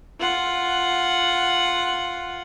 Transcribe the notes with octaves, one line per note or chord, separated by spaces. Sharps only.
F4 F#5